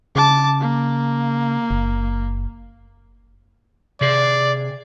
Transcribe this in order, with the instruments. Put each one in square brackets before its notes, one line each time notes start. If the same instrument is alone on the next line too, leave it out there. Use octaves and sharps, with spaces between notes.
[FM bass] C#3 [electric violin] A5 D6
[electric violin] A#3
[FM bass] F#1
[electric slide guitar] C3 G#4 [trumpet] D5